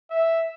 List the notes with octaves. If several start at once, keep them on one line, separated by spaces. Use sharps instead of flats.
E5